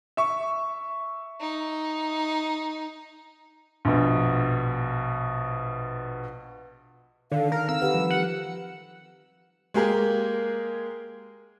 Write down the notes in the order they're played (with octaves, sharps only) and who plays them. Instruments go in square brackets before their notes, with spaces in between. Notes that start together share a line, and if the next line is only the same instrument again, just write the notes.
[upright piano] E5 C#6
[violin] D#4
[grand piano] A#1 B2
[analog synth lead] D3 [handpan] D#3 A4 [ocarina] F5
[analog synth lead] A#4
[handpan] C4 [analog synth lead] E6
[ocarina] G4 [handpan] B4 F#5
[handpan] F3 G3
[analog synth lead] F#5
[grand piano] G#3 A#3 G4 G#4 A#4